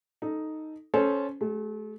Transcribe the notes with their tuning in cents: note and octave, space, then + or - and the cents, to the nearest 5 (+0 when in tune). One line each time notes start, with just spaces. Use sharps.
D#4 +0 A4 +0
C#4 +0 A4 -20 C5 +0
A3 -40 G4 +0